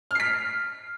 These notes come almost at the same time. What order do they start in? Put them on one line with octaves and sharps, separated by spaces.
F6 C7 B6